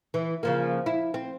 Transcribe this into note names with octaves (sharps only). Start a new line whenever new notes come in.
E3
C#3 F3 A#3
E4
C4